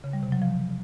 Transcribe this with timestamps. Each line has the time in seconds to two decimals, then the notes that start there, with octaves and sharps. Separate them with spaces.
0.04 C#3
0.13 G3
0.23 C3
0.32 F#3
0.42 F3